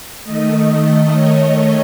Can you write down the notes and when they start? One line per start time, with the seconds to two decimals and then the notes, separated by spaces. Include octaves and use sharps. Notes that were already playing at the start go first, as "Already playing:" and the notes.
0.24 D#3 A3 D#5
0.68 D#5
1.13 C#5